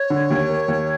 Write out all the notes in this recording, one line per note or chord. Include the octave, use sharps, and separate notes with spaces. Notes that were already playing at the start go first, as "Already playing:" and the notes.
Already playing: C#5
D3
D#2
A#3
D#2